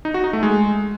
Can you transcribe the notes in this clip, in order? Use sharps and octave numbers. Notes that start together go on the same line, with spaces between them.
D#4
F#4
D#4
A3
G#3